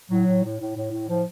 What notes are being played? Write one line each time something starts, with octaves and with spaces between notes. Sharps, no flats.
A2 F#3
A2
A2
A2
A2
A2
A2 F3